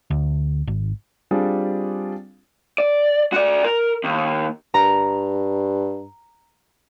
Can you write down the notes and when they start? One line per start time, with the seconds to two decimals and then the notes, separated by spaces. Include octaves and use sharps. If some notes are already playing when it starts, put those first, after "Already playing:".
0.10 D2
0.67 G#1
1.31 G3 C4 D4 F4 G#4
2.78 D5
3.33 F#4 D5
3.64 A#4
4.04 D#2
4.74 G2 A#5